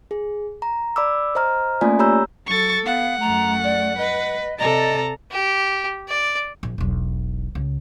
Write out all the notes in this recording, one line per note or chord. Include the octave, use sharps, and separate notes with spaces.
G#4
A#5
D5 B5 D6 E6
C5 D#5 A#5 F6
A3 A#3 C#4 F4 D5 G#5
G4 C#5 A#5 B5 E6 G6
F#3 A4 C#6 A6
B3 F5 F#5
F#2 A3 A#5
D5
B4 D#5
C3 A4 D5 D#5 A#5
G4
D5
A#1
E1 B1
C#2